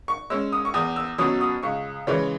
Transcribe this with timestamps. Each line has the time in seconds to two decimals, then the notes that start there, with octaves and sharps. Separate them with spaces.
0.08 C#6
0.30 G#3 C#4 E6
0.52 D#6
0.65 C#6
0.74 E2 D#6
0.96 E6
1.18 B2 F#3 C#4 D#6
1.41 D#6
1.63 C#2 C#6
2.07 C#3 E3 G#3 C#5